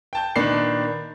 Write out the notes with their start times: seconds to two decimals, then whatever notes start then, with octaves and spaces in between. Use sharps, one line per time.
0.13 G5 A5 G6
0.36 A#2 D#3 D4 B4 C7